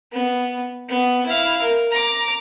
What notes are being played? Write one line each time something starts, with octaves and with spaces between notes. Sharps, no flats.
B3
B3
E4 F5
A#4
A#5 D6